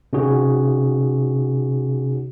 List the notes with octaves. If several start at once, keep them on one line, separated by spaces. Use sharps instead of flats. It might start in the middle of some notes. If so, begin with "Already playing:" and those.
C3 C#4 D#4 F#4 G#4